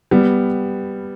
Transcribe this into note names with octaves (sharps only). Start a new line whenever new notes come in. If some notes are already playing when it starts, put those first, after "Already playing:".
G3 B3